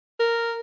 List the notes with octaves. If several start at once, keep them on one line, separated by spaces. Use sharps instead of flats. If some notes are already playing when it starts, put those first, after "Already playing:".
A#4